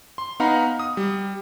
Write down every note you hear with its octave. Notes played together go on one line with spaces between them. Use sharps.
C6
B3 D#4 F5 F#5 A#5 B5
D#6
G3